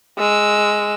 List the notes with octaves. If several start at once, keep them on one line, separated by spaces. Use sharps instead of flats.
G#3 E6